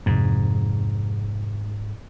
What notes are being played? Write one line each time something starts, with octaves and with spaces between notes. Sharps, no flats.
F2 G#2 C3